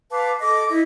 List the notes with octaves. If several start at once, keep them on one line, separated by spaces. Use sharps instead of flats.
B4 F5 A5 D6
A4 D#5 D6
E4 D#5